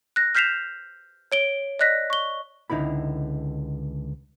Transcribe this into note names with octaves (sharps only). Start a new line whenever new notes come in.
F#6 A#6
F6 G6 B6 C7 E7 F7
C#5 D7 G7
D5 D#5 F#6 A#6 B6
C#6 G7
C#2 D3 D#4 E4 B5